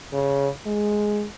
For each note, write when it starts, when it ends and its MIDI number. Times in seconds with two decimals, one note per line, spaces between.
0.13 0.48 49
0.66 1.25 56